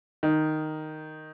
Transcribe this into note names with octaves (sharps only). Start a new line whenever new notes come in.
D#3